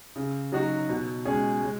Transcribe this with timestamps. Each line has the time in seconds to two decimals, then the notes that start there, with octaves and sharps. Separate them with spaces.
0.16 C#3
0.52 F#3 D#4 F#4
0.89 B2
1.25 G#3 C#4 G#4
1.61 G#3